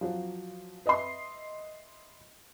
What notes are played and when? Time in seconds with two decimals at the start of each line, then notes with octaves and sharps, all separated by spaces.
0.01 F3 F#3
0.86 B4 D#5 E5 C6